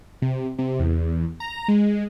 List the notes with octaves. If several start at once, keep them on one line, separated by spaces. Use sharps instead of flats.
C3
C3
E2
A#5
G#3